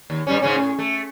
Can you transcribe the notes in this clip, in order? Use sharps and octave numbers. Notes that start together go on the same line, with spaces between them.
D#2
G2 G3 C#4
G#2 C#3 C#4
A2
A3